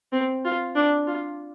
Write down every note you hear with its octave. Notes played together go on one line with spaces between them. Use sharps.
C4
F4
D4
F4